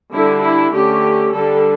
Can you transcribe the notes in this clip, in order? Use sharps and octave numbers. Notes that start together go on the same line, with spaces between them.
D3 G3 D4 E4
E4
D3 A3 C#4 G4
D3 G3 D4 A4